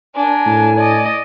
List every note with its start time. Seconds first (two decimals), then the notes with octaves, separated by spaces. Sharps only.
0.15 D4 A#4 G#5
0.46 A2
0.77 D5 D#5